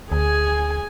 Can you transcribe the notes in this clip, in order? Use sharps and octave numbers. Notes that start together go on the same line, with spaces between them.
D2 G#4 G#5